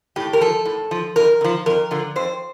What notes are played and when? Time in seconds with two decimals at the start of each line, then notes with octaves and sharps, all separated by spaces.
0.16 A2 G4
0.33 A#4
0.41 F3 A4
0.65 A2
0.91 F3
1.16 F2 A#4
1.41 D3
1.44 F3
1.66 F2 A#4
1.91 D3 F3
2.16 F2 C5